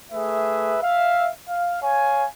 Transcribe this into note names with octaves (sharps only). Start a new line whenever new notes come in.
A3 G#4 B4 E5
E5 F5
F5
C#5 F5 G#5